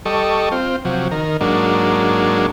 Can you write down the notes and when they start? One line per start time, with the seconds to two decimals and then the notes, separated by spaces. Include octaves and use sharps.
0.06 G3 A4 D#5 C#6
0.52 C4 F4
0.85 C3 F3 F#3
1.11 D#3 A#4
1.41 G#2 F#3 A#3 D4